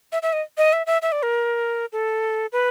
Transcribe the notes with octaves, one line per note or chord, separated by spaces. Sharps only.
E5
E5
D#5
D#5
E5
E5
E5
D5
A#4
A4
B4